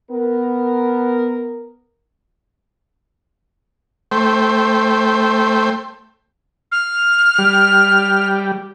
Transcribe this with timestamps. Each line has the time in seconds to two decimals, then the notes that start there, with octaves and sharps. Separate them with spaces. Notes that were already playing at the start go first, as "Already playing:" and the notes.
0.11 B3 A#4
4.12 A3 C5 G5
6.72 F6
7.39 G3